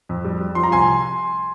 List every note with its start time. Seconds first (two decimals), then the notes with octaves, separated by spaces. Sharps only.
0.09 F2
0.24 G3
0.40 G3
0.55 F3 C6
0.63 A#5
0.71 C2 G#5 C6